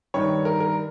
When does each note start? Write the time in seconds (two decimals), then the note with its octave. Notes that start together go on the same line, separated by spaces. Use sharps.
0.14 G2 D#3 C#5
0.45 A#4
0.60 A#4